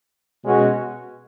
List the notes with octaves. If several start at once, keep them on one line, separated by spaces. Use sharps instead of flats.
B2 G#3 C#4 F#4